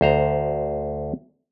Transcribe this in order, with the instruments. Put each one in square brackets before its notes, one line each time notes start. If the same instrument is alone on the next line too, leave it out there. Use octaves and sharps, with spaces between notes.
[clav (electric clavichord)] D2 C5 A#5